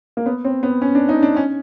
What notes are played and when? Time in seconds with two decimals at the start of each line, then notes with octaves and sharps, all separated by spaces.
0.17 A#3
0.26 B3
0.45 C4
0.63 B3
0.82 C#4
0.95 D4
1.09 D#4
1.23 D4
1.36 C#4